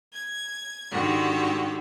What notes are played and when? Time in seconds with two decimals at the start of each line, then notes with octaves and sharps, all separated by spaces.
0.13 G#6
0.91 G#2 D3 D#3 F#4 G4